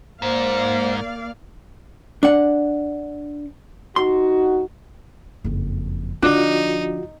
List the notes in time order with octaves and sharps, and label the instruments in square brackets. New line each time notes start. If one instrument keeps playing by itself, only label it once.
[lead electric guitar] G#2 [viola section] A#3 D5 F5 [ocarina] C5
[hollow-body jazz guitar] D4 F#5
[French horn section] D2 D#4 F#4 [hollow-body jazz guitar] C6
[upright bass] F#1 F2
[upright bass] D3 F3 [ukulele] D4 [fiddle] D#4 [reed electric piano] F4 F#4